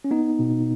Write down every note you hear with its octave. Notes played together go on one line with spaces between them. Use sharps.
C#4
B3 D#4
B2